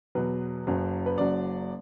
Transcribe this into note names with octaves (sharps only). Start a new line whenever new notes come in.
E2 B2 F#3 B4
F#1 F#2 F#3
B4
F#1 F#2 F#3 D5